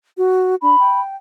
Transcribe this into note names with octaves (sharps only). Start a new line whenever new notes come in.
F#4
D4 B5
G5